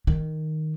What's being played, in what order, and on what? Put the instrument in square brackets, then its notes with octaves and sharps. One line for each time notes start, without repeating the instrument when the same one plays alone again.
[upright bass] D#3